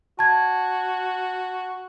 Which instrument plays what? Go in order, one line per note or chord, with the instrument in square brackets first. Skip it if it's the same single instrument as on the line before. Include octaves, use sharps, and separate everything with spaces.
[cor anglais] F#4 [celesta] A5 G#6